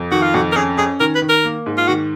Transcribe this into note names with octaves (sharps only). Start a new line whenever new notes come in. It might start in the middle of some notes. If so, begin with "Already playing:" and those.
Already playing: F2
D#3 F#4
F4
F2 F#4
A#4
C#4 G#4
C#4 G#4
D#3 A#4
B4
D#3
A#4
A#3
G#2
F4
D#3 F#4